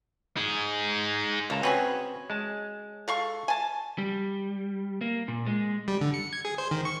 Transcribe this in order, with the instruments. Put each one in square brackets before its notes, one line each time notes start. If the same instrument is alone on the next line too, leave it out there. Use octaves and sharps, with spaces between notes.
[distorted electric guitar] D#4 G#4
[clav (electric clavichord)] C#2 A5 A#5 [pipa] A#3
[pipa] F#3 C#4 G#4 [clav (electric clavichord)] C4 B4 C#5
[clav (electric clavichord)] G#3 A5
[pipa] A4 F5 C#6
G#5 A5
[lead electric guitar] G3
A#3
A#2
G#3
[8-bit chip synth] G3
D3
C#7
G#6
G#4
C5
D#3
C#6